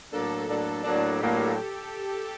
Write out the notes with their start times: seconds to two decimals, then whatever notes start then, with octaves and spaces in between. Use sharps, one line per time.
0.12 A2 F#3 A#3 D4 A4
0.48 A2 F#3 A#3 D4
0.83 A2 F#3 A#3 D4
1.20 A2 F#3 A#3 D4 G4